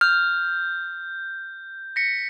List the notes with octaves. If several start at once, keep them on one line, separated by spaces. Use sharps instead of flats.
F6 G6
A#6 B6 C#7